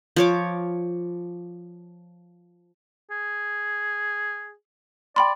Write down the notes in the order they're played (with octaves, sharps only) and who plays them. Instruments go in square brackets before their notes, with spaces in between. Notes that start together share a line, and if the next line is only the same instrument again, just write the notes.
[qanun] F3 C#5 D6
[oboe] G#4
[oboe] D5 [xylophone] G5 B5 C6